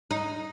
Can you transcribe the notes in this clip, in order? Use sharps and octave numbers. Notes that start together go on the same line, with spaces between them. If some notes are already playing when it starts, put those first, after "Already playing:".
D#4